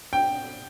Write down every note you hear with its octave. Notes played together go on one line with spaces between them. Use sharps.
G5